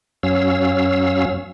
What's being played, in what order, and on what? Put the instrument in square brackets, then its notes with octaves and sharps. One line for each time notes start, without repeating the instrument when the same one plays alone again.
[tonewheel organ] F#2 F#3 C#4 F5 E6